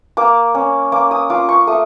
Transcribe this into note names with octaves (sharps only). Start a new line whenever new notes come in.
A#3 D6
C#4
A#3 D6
D#6
F4 D6
C#6
A3 D#6